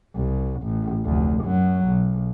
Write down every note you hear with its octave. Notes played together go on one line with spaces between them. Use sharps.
C2
A1
F1 D2
F#2 F#3
B1